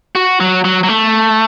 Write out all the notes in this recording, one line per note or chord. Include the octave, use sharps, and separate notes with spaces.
F#4
F#3
F#3
F#3
A3